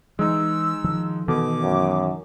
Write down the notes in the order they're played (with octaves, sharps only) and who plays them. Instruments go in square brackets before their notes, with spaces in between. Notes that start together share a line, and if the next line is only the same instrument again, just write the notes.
[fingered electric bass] E3 [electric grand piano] G#3 D#4 [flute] E6
[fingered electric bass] D#3 F3
[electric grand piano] B2 [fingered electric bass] D#3 E3 [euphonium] A4 [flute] D6
[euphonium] F#2